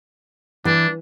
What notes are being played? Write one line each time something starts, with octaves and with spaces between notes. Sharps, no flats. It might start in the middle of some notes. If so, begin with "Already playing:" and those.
E3 D4